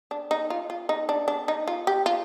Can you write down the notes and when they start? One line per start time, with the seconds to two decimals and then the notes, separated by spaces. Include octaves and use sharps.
0.11 D4
0.31 D#4
0.50 F4
0.70 F4
0.89 D#4
1.09 D4
1.28 D4
1.48 D#4
1.68 F4
1.87 G4
2.06 F4